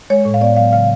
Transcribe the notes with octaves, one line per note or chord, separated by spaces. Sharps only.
G#3 C#5
A2
F5
B3 D5
F#3 F5
C#3 F5